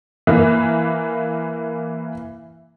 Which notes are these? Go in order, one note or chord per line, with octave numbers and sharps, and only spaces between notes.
E3 A#3